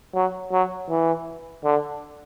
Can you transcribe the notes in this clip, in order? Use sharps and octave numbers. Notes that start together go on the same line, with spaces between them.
F#3
F#3
E3
D3